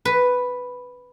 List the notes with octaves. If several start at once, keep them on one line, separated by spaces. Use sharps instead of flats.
B4